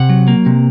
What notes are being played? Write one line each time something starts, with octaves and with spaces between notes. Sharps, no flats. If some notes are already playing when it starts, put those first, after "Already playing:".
Already playing: C3 F#5
F#3
A#3
C3